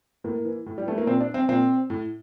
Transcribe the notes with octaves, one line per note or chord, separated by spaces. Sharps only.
A2 A#3
E3
A2
G3
E3 A3
A#3
A#2 C4
D4
C4
A#2 C4
A2